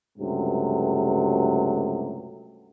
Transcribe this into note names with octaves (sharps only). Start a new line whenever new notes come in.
C#2 G2 C3 F#3 A3